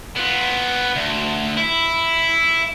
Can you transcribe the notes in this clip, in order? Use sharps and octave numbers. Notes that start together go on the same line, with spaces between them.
B3 F4
D2
E4